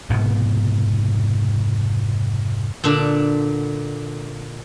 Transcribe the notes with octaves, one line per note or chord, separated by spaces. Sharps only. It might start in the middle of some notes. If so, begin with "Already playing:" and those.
F1 G#2 B2 B3
A#2 D3 D4